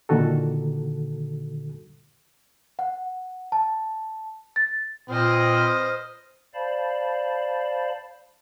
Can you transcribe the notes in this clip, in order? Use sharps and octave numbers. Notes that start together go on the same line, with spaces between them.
A#2 D3 D#3 F#4 A4
F#5
A5
A6
A#2 C4 B4 C5 D#5 D#6 F6
C5 D5 F5 A5 B5